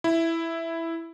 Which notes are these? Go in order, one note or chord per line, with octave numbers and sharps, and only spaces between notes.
E4